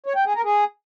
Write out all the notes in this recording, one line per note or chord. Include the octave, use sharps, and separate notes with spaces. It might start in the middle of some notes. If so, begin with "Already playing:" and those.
C#5
G5
G#4
A#4
G#4